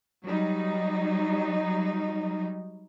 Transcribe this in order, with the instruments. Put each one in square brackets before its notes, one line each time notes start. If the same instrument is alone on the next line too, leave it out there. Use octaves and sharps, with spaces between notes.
[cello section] F#3 G3 D#4